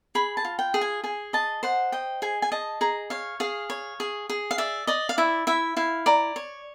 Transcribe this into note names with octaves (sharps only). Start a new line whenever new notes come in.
G#4 B5
A5
F4
G5
G#4
G#5
G#4 G#5
D#5 A5
C5 F#5
D#5 G5
G#4 G#5
G#5
D#5 A5
G#4 A#5
C#5 F5
G#4 F5
C#5
G#4
G#4
F5
D5 E5
D5 D#5
F5
E4 E5
E4 E5
E4 F5
D5 A#5
C#5